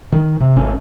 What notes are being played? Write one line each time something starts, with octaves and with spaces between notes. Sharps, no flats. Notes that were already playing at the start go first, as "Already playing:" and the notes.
D#3
C3
G#1 C#4